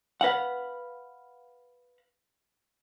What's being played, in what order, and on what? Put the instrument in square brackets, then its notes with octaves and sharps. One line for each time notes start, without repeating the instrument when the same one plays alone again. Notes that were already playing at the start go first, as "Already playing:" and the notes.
[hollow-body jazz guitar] B4 F5 F#5